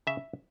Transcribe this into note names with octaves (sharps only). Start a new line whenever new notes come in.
C#3 E5